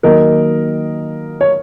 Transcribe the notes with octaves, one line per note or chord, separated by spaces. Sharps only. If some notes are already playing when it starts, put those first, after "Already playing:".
D#3 F#3 A#3 A#4 D#5
C#5